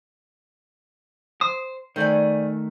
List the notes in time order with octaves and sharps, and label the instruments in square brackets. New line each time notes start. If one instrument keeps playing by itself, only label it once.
[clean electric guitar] C5 [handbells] D#6
[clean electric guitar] D#3 A3 [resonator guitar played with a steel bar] C5 D5 G#5